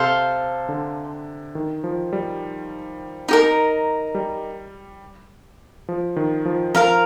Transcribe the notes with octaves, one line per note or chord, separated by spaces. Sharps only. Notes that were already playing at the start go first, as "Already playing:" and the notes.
Already playing: C3 A4 C5 F5
D3
D#3
F3
G3
D#4 G4 A#4
G3
F3
D#3
F3
F3 A#4 F5 A#5